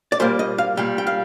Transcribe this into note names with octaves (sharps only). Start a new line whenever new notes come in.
D5
A#2 G3 A#3 C5
D#5
F5
A#2 G3 A#3 G5
G5
F5